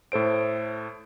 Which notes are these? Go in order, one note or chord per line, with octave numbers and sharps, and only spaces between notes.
A2 A4 C5 D7